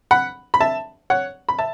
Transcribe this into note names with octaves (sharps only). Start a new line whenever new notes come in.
F#5 B5
B5
E5 A5
C#5 F#5
B5
E5 A5